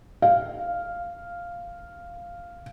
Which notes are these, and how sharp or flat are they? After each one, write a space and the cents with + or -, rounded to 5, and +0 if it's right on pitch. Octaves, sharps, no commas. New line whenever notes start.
F5 -5